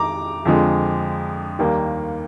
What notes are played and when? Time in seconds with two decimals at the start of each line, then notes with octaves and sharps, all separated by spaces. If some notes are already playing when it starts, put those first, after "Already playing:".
Already playing: F2 D#3 G#3 A#5 D6
0.45 F2 D3 F3 G#3
1.59 D#2 D#3 G3 A#3